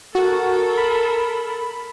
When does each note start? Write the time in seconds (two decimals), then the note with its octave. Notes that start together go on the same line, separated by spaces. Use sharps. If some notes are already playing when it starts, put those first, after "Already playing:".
0.15 F#4 A4 A#4
0.78 B5